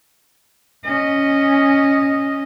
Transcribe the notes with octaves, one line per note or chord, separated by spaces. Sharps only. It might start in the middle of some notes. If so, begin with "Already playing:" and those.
C#4 D#5